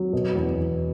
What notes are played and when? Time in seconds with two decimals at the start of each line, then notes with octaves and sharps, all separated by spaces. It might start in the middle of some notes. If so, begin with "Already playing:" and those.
Already playing: F#3
0.13 B2
0.36 E2